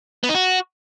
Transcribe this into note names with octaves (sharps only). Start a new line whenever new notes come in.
B3
D#4
F#4